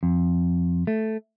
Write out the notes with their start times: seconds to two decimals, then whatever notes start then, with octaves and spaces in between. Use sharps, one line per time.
0.03 F2
0.87 A3